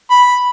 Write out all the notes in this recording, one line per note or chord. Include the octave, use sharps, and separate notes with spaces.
B5